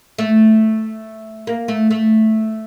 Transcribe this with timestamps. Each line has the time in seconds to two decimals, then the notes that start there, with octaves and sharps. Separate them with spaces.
0.18 A3
1.47 A#3
1.68 A3
1.90 A3